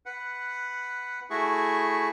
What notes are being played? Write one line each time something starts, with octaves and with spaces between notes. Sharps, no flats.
B4 F#5
A3 E4 F#4 G#4 C#6